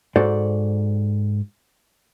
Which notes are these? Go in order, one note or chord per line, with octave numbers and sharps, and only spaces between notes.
G#2 F#4 A4 C5 D5